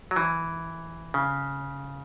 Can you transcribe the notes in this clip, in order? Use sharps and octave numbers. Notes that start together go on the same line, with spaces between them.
F#3
E3
C#3